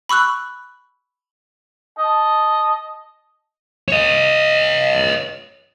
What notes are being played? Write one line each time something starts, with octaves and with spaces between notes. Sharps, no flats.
B5 C#6 E6 F#6
D#5 A5
C#5 D#5